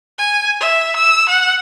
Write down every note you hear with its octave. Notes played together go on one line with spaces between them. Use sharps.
G#5
E5
E6
F#5